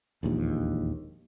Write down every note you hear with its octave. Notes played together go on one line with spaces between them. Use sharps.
E1 A#1 D#2